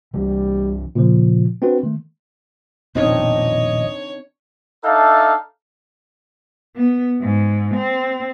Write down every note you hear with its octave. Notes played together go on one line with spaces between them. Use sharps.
C2 E3 G3
A#2 C#3 F3
C4 D4 F#4 B4
D#3 A3
D#1 F2 B2 C4 D4 D#4 C#5 D#5
D4 D#4 A4 E5 F5 A5
B3
G#2
C4